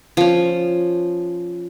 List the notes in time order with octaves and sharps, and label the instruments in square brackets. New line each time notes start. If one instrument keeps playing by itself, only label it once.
[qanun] F3 C#4